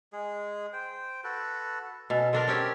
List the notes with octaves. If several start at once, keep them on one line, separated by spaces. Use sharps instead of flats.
G#3 G#4
C5 G5
F#4 A4 B4
B2 C#4 A4
D3 D4 A4 A#4 A5 C6
C4 C#4 G4 A#4